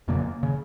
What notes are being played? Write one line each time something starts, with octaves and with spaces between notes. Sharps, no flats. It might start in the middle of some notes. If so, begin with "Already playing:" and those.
F2 C#3 A#3
C#3